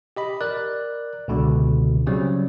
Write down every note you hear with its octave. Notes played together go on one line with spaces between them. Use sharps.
G4 D#5 B5
A#4 D5 F#6
C#2 B2 D3
C#3 F#3 G3 C4